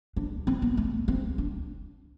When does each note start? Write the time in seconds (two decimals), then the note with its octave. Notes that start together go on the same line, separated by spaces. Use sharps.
0.16 D4
0.47 C4
0.62 B3
0.77 A3
1.08 C4
1.38 D4